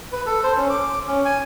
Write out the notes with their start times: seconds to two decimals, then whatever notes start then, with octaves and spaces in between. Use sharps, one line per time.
0.12 B4
0.26 A4
0.43 C5
0.57 C#4
0.70 D6
1.07 C#4
1.25 G#5